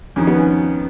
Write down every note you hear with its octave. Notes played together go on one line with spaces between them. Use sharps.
F2 D#3 C#4
B3
C#4